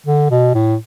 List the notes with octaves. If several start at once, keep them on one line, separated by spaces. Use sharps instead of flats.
D3
B2
A2